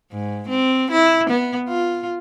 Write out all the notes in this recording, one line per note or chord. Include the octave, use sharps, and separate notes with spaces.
G#2
C4
E4
B3
F4